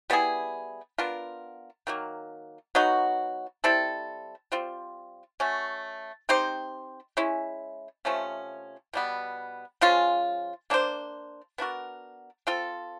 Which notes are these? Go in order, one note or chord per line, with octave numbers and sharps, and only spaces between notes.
G3 B3 E4 G#4
B3 D4 F4 A#4
D#3 F#3 A#3
F#3 B3 D#4 F#4
G3 C4 E4 A4
G3 C4 F4
A3 C#4 F#4
C4 D#4 G4 C5
G#3 C#4 E4
C3 F3 A3 C#4
B2 G3 B3
F3 G#3 C#4 F4
A#3 D4 G4 C5
B3 D4 F#4 A#4
C4 F4 A4